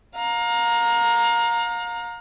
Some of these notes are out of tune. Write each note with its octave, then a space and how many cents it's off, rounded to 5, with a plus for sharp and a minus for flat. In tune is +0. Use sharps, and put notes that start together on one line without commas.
F5 +35 A#5 +0